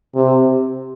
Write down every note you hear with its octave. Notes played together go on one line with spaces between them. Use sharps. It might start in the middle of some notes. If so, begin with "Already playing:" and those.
C3